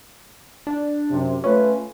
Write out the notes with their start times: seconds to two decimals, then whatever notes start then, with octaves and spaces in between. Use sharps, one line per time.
0.67 D4
1.11 F#2 C3
1.44 A3 C#4 F4 B4